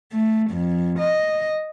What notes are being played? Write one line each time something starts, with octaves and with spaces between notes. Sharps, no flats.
A3
F2
D#5